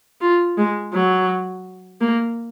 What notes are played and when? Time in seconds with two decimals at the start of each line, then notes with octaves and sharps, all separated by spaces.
0.21 F4
0.57 G#3
0.93 F#3
2.01 A#3